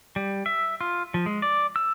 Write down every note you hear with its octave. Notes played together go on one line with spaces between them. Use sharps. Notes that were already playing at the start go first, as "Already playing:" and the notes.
G3
E5
F4
F3
G#3
D5
E6